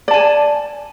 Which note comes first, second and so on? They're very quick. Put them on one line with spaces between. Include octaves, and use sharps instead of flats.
D5 A5 G#5